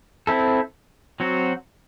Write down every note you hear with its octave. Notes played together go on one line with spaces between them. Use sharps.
C4 E4 A4
F#3 C4 F#4